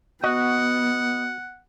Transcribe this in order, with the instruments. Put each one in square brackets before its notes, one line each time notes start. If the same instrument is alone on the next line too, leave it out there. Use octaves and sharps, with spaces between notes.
[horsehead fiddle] B3 [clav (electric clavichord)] F#4 [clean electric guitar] D#5 [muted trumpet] F#5